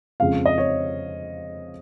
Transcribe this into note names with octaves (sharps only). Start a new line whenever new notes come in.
F2 C#3 F3 G#3 F5
D#5
C#5